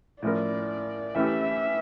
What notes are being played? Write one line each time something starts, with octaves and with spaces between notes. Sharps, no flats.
A2 F3 C#4 E4 A#4 D5
E3 A3 C#4 E4 G4 E5